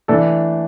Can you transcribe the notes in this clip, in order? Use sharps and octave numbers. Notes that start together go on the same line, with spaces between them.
E3 A3 D4 A4 D5